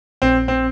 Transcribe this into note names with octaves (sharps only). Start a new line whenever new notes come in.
A#1 C4
C4